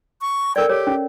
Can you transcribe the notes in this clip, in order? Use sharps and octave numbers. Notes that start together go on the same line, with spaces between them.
C#6
A4 A#4 D5 G5
G4 C#5
C#4